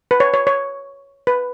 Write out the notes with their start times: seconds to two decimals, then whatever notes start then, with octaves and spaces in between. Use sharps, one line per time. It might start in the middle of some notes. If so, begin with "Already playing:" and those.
0.11 B4
0.20 C#5
0.34 C#5
0.47 C#5
1.27 B4